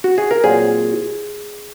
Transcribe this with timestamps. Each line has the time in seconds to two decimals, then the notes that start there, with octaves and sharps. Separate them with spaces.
0.04 F#4
0.18 G#4
0.31 A#4
0.44 A#2 F#3 C4 G#4 C5